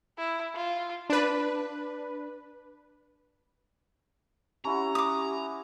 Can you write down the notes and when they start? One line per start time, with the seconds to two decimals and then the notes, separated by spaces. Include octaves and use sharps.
0.18 E4
0.55 F4
1.09 D4 B4
4.65 C#4 E4 F#4 G4 A#5
4.95 D6 D#6